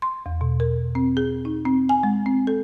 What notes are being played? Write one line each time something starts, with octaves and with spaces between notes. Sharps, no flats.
C6
E2
B2
A#4
C4
G#4
D#4
C4
G#5
G#3
C4
A4